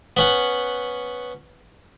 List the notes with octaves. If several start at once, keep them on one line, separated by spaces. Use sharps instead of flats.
B3 C#4 F#5